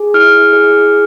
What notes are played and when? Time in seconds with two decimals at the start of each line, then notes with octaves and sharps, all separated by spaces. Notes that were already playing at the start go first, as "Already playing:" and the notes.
Already playing: G#4
0.14 E4 F6
0.53 G#4